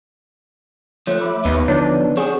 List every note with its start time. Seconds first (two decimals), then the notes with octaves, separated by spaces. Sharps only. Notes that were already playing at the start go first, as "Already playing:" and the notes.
1.07 F3 A3 C5 C#5
1.21 E5 B5 D6
1.45 D#2 B3 D#4
1.68 D3 F3 D4 E4 C#5
2.17 C4 D4 F#4 G#4 C#5 G#5 C#6 D#6